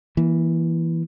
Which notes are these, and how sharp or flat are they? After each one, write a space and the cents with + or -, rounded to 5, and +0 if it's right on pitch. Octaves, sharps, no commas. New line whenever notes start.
E3 +0 A#3 +30